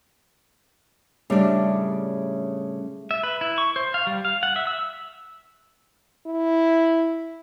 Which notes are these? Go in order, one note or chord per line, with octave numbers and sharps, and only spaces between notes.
A2 C#3 G3 D4
E5
B4
E4
C#6
C5
F5
G3
F5
F#5
E5
E6
E4